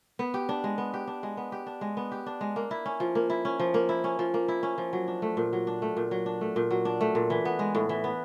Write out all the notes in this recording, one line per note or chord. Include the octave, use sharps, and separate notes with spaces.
B3
G4
D4
G#3
B3
G4
D4
G#3
B3
G4
D4
G#3
B3
G4
D4
G#3
A#3
E4
C#4
F3
A#3
E4
C#4
F3
A#3
E4
C#4
F3
A#3
E4
C#4
F3
F#3
D4
A3
A#2
F#3
D4
A3
A#2
F#3
D4
A3
A#2
F#3
D4
A3
A#2
E3
B3
G#3
A2
E3
B3